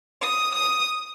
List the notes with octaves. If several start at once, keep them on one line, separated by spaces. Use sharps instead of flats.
D#6
D#6